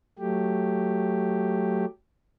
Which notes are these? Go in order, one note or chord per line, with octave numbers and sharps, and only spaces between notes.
F#3 A3 G4